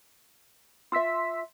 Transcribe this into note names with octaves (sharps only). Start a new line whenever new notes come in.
F4 E5 C6 E6 B6